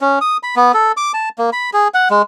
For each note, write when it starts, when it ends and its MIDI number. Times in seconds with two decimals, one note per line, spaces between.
0.01 0.19 61
0.21 0.37 87
0.43 0.55 83
0.56 0.72 59
0.74 0.92 69
0.97 1.12 86
1.14 1.29 81
1.38 1.50 58
1.53 1.70 83
1.73 1.88 68
1.94 2.09 78
2.10 2.22 56